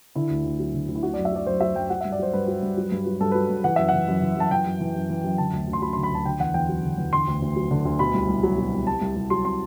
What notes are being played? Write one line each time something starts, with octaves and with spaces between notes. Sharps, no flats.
D3 E4
D2
D2
F#3
D3
D2
E4
F#3 F#4
F#2 D5
E5
F#3 D5
F#2 C5
F#3 E5
F#2 G5
F#3 F#5
G2 E5
D5
F#3 C5
G2 B4
F#3
G2
F#3
G2
F#3
G2 A4
F#3 B4
G2
E3 F#5
F#2 E5
E3 F#5
F#2
E3
F#2 A5
E3 G5
F#2
E3
F#2
E3
F#2
D3 A5
D2
D2
C6
F#3 B5
D3 C6
B5
D2 A5
D3 G5
E2 F#5
E2 G5
F#3
D3
E2
D3 C6
D2
D2
F#3
D3
D2
B2 B5
C2
C2
F#3
B2
C2
C3 A5
C2
C2
F#3 C6
C3 C6